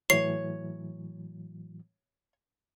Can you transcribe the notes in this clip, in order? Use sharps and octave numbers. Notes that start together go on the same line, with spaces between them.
A2 E3 F#3 C#5 C7